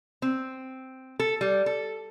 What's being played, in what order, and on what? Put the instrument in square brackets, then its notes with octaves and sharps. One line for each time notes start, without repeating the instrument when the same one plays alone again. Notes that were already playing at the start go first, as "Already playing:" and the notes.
[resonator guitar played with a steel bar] C4
A4
G3
A4